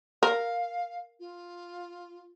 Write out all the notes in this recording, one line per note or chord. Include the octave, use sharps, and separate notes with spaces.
A#4 F5
F4